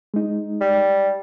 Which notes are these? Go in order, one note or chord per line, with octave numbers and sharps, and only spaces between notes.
G#3 D#4
G3